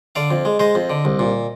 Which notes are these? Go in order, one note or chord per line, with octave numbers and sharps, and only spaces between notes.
D3 D5 F5
F2
G#3
G#3 C5 D#5
F2
D3
C2
A#2